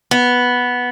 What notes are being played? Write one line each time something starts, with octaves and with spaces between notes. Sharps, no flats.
B3